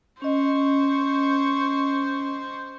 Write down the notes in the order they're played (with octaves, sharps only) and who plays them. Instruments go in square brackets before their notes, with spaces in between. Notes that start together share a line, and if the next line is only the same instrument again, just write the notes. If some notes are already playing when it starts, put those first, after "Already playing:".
[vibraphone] C#4 D#5 [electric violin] C5 C#6